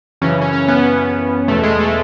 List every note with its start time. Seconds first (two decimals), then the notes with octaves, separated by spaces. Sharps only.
0.21 F#2 C#3 E3 C#4
0.42 C#4
0.53 C#4
0.68 B3
1.48 E2 B2 A3
1.63 G#3
1.80 A3